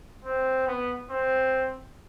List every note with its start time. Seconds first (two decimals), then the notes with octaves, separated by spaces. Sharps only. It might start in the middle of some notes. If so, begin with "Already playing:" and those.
0.24 C4
0.68 B3
1.11 C4